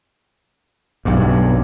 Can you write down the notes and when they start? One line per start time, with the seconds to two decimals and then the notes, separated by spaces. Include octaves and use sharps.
1.05 B1 G2